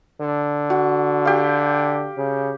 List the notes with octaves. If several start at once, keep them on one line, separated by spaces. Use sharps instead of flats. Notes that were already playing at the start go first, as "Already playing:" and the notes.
D3
F#4
G4 F5
C#3